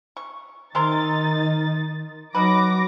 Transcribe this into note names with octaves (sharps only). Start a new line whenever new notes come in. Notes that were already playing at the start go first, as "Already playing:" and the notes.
C#6
C3 D#3 D#4 A#4 C6 A6
F#3 D#4 F#4 B4 D6 A#6